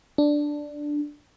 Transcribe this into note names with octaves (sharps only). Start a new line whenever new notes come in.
D4